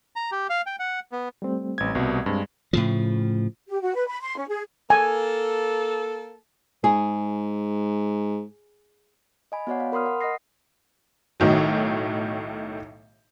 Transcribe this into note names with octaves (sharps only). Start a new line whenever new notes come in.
A#5
G4
F5
G5
F#5
B3
G3 A3 C4
A1 G#6
C2 B2
G2 G#3 C4
A2 C#3 F3
G4
F#4
B4
B5
C6
C#4
G#4
A#3 A4 G#5
G#2 G#4
D#5 G#5 B5
B3 F#4 C#5 D5 F#5
F5
A#4 B5 C6 D#6 F6
F#5
D#5 F#5 D#6 A#6 C7
B1 A2 D#3 F#3